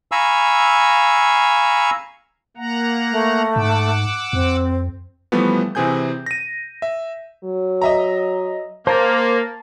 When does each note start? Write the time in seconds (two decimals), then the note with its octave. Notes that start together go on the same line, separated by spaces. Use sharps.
0.12 F5 G#5 A#5 B5 C#6 E6
2.57 A#3 F#5 A#5
3.11 A3
3.56 G#2 F#5 D6 E6
4.33 F2 C4
5.32 E3 F3 G3 A3 B3
5.75 C3 E3 C4 G#4 G#5 G6
6.26 A#6 D#7
6.82 E5
7.44 F#3
7.82 D#5 E5 A#5
8.87 A#3 C5 A5 A6